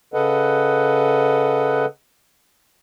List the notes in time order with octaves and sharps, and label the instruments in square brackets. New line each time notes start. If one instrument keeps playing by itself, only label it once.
[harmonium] C#3 A4 B4 D#5 F#5